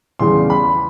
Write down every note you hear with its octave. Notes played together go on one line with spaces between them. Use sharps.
E2 C#3 E3 G3 C6
B5